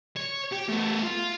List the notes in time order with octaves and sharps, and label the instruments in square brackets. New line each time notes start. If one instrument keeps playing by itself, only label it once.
[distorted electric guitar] C#5
G4
A3 B3
F4